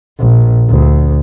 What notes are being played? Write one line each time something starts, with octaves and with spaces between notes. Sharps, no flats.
A#1
D2